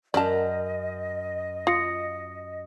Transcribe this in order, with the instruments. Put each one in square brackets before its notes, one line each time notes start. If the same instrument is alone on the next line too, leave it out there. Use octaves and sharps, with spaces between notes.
[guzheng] F#2 A#5 [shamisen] D5 A5 [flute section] D#5
[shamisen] F4 [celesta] D#6 A#6 C#7